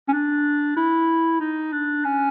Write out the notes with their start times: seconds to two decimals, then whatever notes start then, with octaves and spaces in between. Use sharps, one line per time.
0.08 C#4
0.13 D4
0.77 E4
1.40 D#4
1.72 D4
2.04 C#4